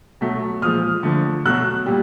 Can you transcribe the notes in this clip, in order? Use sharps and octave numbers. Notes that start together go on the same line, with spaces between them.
B2 F#3 A3
A#2 F3 G#3 D#6 F6
D3 F3 A3
B2 F#3 A3 E6 F#6
A#2 G3